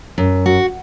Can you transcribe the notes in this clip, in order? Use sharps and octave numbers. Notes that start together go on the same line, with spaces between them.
F#2
F#4